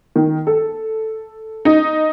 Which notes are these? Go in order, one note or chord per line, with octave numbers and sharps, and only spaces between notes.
D#3
A4
D#4